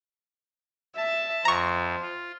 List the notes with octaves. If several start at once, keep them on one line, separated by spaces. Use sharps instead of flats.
E5 A5
F2 C5 A#5 C#6
F4